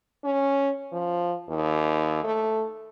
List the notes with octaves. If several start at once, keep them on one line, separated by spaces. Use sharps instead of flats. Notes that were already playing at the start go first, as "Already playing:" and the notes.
C#4
F3
D#2
A3